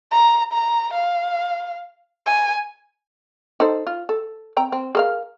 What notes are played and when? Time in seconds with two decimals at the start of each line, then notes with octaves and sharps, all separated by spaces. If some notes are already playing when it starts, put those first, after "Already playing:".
0.12 A#5
0.53 A#5
0.94 F5
2.26 G#5
3.60 D#4 A4 C5
3.87 F4
4.09 A4
4.57 C4 G5 A#5
4.72 C4
4.95 G#4 A#4 F5